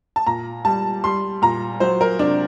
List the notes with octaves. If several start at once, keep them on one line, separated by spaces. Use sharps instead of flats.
A5
A#2 A#5
G3 A5
G3 C6
A#2 A#5
F#3 C5
A#4
C3 D4